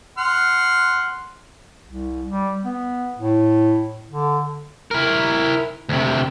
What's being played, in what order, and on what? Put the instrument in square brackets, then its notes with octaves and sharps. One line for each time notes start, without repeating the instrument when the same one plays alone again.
[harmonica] F#5 C6 F6
[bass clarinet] C2
G3
B3
A2
D3
[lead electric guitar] E4 A#4
D2 C3